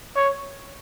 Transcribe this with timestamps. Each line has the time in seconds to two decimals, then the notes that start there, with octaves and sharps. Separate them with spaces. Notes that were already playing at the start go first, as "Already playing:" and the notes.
0.16 C#5